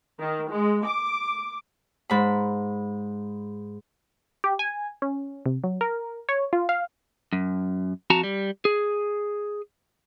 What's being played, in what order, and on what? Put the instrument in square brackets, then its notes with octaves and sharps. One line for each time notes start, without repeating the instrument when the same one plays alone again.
[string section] D#3
G#3
D6
[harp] G#2 B5
[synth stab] G4
G#5
C#4
C3
F#3
A#4
C#5
F4
F5
[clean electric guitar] F#2
F2 F#4 A5 A#5
G3
G#4